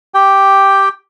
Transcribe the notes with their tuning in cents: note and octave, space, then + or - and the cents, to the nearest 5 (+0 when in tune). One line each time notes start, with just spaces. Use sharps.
G4 +0 G5 +0